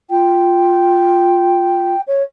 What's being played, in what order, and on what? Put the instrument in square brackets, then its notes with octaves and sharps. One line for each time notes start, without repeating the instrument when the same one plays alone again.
[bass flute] F4 [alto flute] G5
[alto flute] C#5